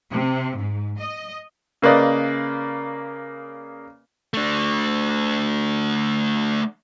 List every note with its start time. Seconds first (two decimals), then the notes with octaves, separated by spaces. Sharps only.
0.12 C3
0.57 G#2
0.99 D#5
1.82 C#3 A#3 B4 D5 D#5
4.34 A3 D4